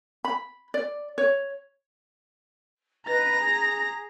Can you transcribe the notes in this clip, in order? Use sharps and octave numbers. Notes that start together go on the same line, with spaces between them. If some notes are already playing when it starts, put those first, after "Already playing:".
B5
D5
C#5
B4 D#5 A#5 A#6
G#4